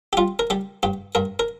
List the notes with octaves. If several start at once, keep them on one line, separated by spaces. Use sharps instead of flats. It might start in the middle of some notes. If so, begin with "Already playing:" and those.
G4
G3 F4
A#4
G3 G4
G2 G4
G2 A#4
A#4